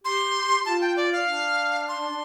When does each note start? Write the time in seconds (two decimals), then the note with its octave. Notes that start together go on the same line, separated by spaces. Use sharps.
0.04 G4 C6
0.66 F4 A5
0.81 G5
0.97 D5
1.12 F5
1.27 D4
1.88 C6